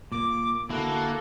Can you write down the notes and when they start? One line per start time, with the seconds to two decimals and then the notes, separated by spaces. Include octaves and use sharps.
0.12 A#2 A#3 D6
0.70 D3 A#3 E4 F#4 A4